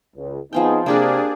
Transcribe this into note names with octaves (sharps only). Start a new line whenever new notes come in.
C#2
F3 B3 C4 D#4 G#4 G5
C3 A#3 D4 G4 G#4 A#4 D5